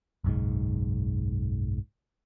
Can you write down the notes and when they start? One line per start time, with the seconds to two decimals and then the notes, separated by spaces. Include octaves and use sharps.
0.24 F#1 B1 G#2